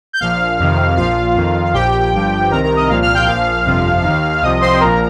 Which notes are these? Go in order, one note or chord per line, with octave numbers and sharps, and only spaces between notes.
G6
A#1 A#2 F3 F5 F6
F2 C3 D#3
A#1 A#2 F3 F4 F5
F2 D#3
F5
A#1 A#2 F3 G4 G5
G1 G2 F3
C2 C3 D#3 A#4 A#5
A#4 A#5
D#5 D#6
C2 A#2 F3 F5 F6
F5 F6
G5 G6
A#1 A#2 F3 F5 F6
G1 F2 C3 F3
D#3
D#2
C2 C3 F3 D#5 D#6
C5 C6
G5
A#1 A#2 F3 A#4 A#5